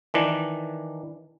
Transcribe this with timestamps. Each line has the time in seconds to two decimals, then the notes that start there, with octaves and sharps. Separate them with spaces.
0.14 D#3 E3 D4